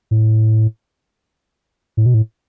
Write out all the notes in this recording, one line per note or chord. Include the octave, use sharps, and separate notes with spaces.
A2
A2
B2
A2